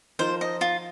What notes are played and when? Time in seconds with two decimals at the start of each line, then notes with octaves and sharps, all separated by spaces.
0.19 F3 D#4 A#4 C5
0.41 D#5
0.61 F4